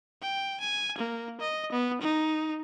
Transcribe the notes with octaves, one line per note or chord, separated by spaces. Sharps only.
G5
G#5
A#3
D#5
B3
D#4